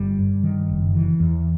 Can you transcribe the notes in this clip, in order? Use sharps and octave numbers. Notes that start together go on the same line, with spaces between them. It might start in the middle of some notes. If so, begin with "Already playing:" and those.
Already playing: G1 G3
G2
D#3
F#1
E3
E2